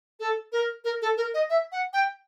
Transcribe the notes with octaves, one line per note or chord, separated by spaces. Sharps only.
A4
A#4
A#4
A4
A#4
D#5
E5
F#5
G5